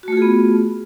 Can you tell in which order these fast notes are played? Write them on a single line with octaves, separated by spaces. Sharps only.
F#4 A3 F4 G#4 B3